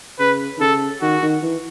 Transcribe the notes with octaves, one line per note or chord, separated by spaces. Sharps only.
C#3 B4
D#3
C#3 A4
D#3 F#4
D#3
E3